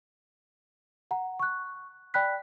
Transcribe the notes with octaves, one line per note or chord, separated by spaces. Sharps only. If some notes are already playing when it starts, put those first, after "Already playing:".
F#5 A#5
C#6 F#6
D5 G5 B5 F#6 B6